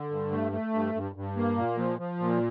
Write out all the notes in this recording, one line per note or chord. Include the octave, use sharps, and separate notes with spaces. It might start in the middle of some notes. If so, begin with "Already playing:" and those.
Already playing: D3
G2
A3
A3
G2
G2
G2
A#3
A#2
F3
F3
A#2